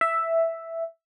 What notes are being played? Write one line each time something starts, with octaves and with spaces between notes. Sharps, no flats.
E5